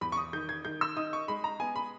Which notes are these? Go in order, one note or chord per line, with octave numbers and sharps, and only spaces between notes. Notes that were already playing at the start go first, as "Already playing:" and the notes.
E2 B5
C#6
D#6
D#3 G6
G#6
D#3 G6
E6
D#4 D#6
C#6
G#3 B5
A#5
B3 G#5
B5